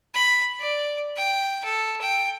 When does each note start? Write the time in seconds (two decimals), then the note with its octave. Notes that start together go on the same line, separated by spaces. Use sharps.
0.14 B5
0.59 D5
1.16 G5
1.64 A4
2.01 G5